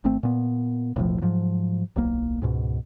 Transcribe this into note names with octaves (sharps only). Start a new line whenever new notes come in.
G#1 A3 C4
A#2 B3
E1 B1 A2 F3
G#2 F3 F#3
D1 B1 A#3
C#2 G#2 B2